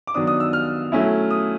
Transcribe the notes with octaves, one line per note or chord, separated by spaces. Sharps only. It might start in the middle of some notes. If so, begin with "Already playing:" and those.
D6
D#3 F#3 B3 D4 D#6
D#6
E6
F6
F#3 A3 C#4 E4
D#6